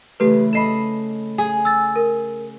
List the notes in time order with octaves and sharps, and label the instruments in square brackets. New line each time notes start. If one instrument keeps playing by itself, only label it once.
[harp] C#3 E3 A3 [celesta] G4 A4 B4
[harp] A4 D#5 B5 [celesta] C7 E7
[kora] G#4
[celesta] E6 A6
A#4